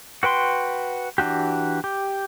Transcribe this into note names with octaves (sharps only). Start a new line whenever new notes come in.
F#4 B4 G5 C6
E3 D4 F#4 G4
G4